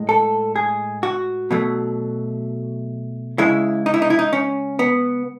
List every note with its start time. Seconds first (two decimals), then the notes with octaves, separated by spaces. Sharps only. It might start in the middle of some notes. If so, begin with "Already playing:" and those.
Already playing: A2 G#3
0.09 A4
0.56 G#4
1.03 F#4
1.51 B2 F#3 A3
3.38 C#3 G#3 E4
3.86 D#4
3.94 E4
4.02 D#4
4.10 E4
4.19 D#4
4.33 C#4
4.79 B3